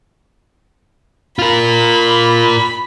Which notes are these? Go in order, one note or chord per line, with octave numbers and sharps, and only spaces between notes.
F4 A#4 B5